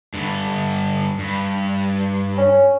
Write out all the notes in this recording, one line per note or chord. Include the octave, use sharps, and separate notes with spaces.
G2 D3
G2
C#4